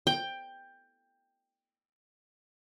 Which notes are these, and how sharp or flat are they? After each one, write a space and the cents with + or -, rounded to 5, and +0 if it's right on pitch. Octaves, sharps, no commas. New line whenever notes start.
G5 +10